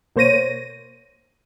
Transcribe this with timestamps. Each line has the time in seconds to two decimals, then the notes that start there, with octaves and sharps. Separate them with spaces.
0.16 B2 A#3 C5 C#5 A#6 D#7